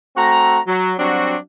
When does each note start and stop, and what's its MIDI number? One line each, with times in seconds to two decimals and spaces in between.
0.17 0.59 57
0.17 0.59 60
0.17 0.59 66
0.17 0.59 82
0.67 0.93 54
0.99 1.36 54
0.99 1.36 55
0.99 1.36 60
0.99 1.36 62
0.99 1.36 66